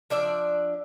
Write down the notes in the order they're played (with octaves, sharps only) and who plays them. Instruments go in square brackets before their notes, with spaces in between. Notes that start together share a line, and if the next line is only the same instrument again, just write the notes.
[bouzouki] F3 D4 D5 E5